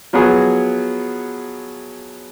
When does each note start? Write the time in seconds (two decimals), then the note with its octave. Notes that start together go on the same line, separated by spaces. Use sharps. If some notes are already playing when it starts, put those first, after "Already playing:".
0.13 F3 F#3 B3 F#4 G#4